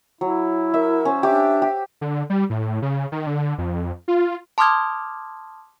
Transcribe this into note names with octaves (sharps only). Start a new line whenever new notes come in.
F#3 E4
A#4 E5
C#4 C5
D4 G4 E5 D6
G4
D3
G3
A2
C#3
D#3
D3
F2
F4
A5 C6 D6 D#6 F6 G#6